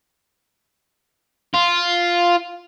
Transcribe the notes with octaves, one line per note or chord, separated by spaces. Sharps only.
F4